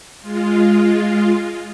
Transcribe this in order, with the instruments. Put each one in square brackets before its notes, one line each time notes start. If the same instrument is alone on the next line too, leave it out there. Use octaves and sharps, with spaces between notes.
[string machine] G#3 F4